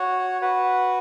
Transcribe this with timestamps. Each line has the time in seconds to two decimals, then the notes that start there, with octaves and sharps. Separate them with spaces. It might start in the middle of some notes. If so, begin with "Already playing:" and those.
Already playing: F#4 C#5 F#5
0.41 F#4 B4 F#5